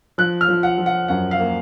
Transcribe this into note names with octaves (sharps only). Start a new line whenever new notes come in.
F3 F#6
F6
F3
F#5
F3
F#5
F#2 F#5
F5
A#3